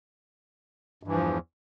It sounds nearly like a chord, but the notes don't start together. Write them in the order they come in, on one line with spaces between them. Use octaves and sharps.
G2 E3 F3 E2